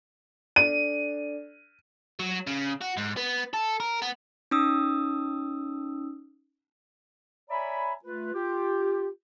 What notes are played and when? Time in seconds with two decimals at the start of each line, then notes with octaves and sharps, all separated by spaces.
0.56 D4 A4 D5 D#7
2.20 F#3
2.47 C#3
2.81 F#4
2.97 G#2
3.16 B3
3.53 A4
3.80 A#4
4.02 B3
4.51 C#4 D#4 D#6 E6
7.50 C#5 D5 E5 G#5 A#5 B5
8.03 A3 F4 B4
8.34 F4 G4